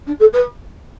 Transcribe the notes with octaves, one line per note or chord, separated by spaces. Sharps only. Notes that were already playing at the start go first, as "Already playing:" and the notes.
D4
A4
B4